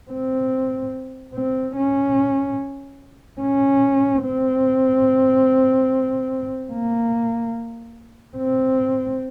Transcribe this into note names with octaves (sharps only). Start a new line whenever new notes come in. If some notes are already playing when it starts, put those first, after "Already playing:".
C4
C4
C#4
C#4
C4
A#3
C4